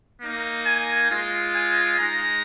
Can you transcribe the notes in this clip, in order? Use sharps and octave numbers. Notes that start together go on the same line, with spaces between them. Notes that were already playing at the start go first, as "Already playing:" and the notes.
A#3 D#4
G#5
G#3 F4
G#5
G#3 D#4 A#5